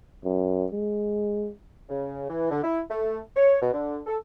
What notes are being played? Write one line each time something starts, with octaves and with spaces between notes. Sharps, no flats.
F#2
G#3
C#3
E3
D3
E4
A3
C#5
B2
D3
A4